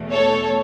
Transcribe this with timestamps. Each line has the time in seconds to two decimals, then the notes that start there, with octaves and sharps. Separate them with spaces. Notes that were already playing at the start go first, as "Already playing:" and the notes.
Already playing: E2 B2 A3
0.12 A4 C#5